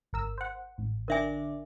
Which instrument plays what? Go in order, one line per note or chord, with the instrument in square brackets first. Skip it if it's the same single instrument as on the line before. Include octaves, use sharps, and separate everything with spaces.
[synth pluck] G#1 A#4 E6
C5 F#5
A1
[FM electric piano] D3 D4 D5 [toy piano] A#4 E5 G#5